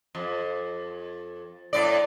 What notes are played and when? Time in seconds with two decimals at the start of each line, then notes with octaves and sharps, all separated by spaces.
0.15 F2
1.73 A2 D5